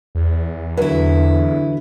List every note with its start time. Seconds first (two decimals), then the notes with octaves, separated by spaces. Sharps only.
0.15 E2
0.77 D3 F#3 E4 B4